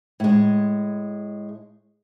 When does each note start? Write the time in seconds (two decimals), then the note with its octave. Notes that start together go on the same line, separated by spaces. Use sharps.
0.20 A2 G#3